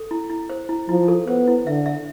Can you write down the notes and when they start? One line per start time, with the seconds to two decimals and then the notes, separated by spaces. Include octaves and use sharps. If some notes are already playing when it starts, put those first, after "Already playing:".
Already playing: A4
0.11 E4
0.30 E4
0.50 C5
0.69 E4
0.89 F3 E4
1.08 A4
1.27 B3 C5
1.47 E4
1.66 D3 E5
1.86 E5